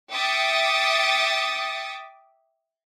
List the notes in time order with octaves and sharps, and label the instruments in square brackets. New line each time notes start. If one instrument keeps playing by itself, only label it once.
[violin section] E5 G5 D6 D#6 A6 C#7